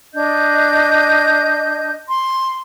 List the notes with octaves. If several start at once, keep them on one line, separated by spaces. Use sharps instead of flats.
D4 D#5 G6
C6